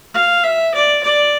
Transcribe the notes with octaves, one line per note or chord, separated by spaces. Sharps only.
F5
E5
D5
D5